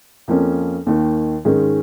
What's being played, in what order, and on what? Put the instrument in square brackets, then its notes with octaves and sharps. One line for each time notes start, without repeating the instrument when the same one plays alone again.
[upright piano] F2 F3 A#3 C#4
D#2 D#3 A#3
G#2 D#3 G#3 C#4